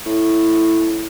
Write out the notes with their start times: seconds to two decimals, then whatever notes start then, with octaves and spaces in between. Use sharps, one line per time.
0.06 A2